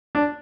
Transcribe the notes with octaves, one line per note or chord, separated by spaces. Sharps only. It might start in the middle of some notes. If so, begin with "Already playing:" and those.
D4